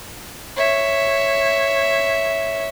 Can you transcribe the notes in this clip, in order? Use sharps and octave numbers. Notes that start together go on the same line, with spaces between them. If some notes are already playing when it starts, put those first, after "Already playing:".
C#5 E5